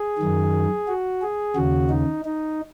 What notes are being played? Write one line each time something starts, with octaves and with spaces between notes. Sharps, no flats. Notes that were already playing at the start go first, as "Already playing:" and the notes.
Already playing: G#4
F#2 D#3
F#4
G#4
D#2 C#3 F#4
D#4
D#4